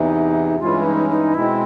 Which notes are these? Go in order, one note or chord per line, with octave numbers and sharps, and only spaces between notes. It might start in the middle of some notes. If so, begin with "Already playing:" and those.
Already playing: E2 C3 E3 D#4
G2 E3 G#3 C#4 E4 F4
D#4
D#4
B2 G#3 C4 E4